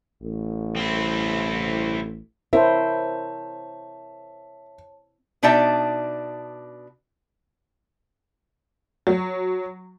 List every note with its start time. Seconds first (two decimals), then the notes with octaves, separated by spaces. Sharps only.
0.23 A1
0.76 C4 E4
2.53 C4 E4 A#4 C5 C#5 E5 A5
5.43 B2 D4 D#4 D5 E5 A5
9.07 F#3